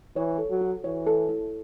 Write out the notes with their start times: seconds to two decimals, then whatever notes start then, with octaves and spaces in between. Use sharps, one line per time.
0.16 E3 C#5
0.38 A4
0.50 F#3
0.61 F#4
0.84 E3 C#5
1.07 A4
1.29 E4